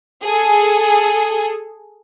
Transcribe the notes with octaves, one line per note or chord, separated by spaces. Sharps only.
G#4 A4